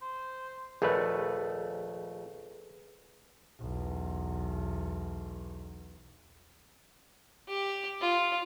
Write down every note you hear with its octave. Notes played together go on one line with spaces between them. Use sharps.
C5
A#1 D#2 A3 G#4 A4 B4
B1 E2
G4
F4